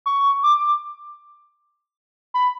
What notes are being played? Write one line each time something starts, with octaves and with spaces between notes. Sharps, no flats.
C#6
D6
B5